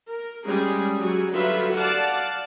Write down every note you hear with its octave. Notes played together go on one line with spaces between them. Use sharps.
A#4
G3 G#3 C#4 G#4
F#3 G3 G#4
D3 F#3 G3 F4 B4 E5
D5 F5 F#5 A5